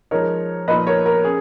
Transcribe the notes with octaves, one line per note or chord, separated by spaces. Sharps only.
F3 G#3 D#4 A#4 C#5
A#2 F3 A#3 D#4 B4 D#5
A#4 C#5
A#4
C#4 G#4